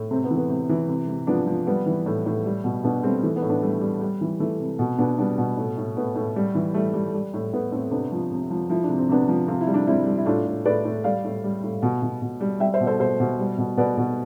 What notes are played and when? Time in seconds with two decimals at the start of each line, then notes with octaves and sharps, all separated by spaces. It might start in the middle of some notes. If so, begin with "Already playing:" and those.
Already playing: A2
0.11 C3 A3 C4
0.24 B3
0.31 E3
0.37 B3
0.49 C3
0.69 E3
0.88 C3
1.08 C3
1.27 F3 B3 D4
1.47 F3
1.67 G3 B3
1.86 E3
2.06 A2
2.26 A2
2.46 G3
2.64 B2
2.83 B2 B3 D4
3.03 G3 A3 C4
3.23 E3 A3
3.36 B3
3.42 A2
3.49 B3 D4
3.62 G3 A3
3.81 G3
4.01 G3
4.21 E3
4.40 E3 A3
4.60 C3
4.79 B2
4.98 B2 B3 D4
5.18 G3 B3 D4
5.38 B2
5.57 A2
5.78 A2
5.96 A2 B3
6.16 A2
6.36 G3
6.55 E3
6.74 G3 A3
6.94 G3
7.14 G3
7.34 A2
7.53 A2 B3
7.72 A2 A3 C4
7.91 C3 B3 D4
8.12 F3
8.32 C3
8.50 F3
8.70 F3 E4
8.83 D4
8.89 C3
8.98 C4
9.09 C3 B3 D4
9.29 F3
9.48 C3 F4
9.61 E4
9.67 G3
9.74 D4
9.87 G3 C4 E4
10.06 G3
10.18 E4
10.26 A2 D4 F4
10.46 A2
10.65 A2 B4 D5
10.85 A2
11.04 G3 D5 F5
11.24 A2
11.44 G3
11.63 A2
11.82 B2
12.02 B2
12.22 B2
12.40 G3
12.60 G3 E5 G5
12.74 C5 E5
12.81 B2
12.87 A4 C5
13.00 B2 A4 C5
13.20 B2
13.39 G3
13.58 B2
13.77 B2 B4 D5
13.97 B2